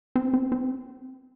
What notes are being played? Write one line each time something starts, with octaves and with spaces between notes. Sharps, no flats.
C4
C4
C4